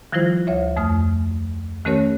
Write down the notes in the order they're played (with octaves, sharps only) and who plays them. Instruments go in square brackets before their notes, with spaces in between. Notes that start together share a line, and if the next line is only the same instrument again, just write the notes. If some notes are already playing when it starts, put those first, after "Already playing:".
[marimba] D#3 F3 G3 E4 F4 C5
D2 C#5 E5
F2 A3 D#6 F6
D#3 A3 C#4 G4 A#4 C#5